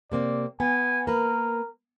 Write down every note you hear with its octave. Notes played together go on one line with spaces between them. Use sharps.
C3 A#3 C4 D5
B3 G#5
A#3 A#4 B4